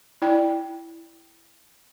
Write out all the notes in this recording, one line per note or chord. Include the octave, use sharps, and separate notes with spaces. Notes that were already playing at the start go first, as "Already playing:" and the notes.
E4 D5 G5